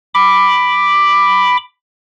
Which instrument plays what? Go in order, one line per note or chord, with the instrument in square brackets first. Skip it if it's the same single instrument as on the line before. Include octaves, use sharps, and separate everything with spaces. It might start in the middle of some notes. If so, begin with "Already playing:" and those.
[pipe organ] B5 D6